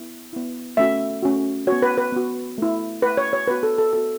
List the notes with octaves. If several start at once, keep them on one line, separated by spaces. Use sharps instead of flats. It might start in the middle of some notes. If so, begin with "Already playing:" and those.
Already playing: B3 E4
B3 E4
A3 C#4 F#4 E5
A3 C#4 F#4
F#4 C#5
B3
B4
B4
B3 F#4
A3 E4
A3 E4 B4
C#5
C#5
B3 F#4 B4
A4
A4
B3 F#4 A4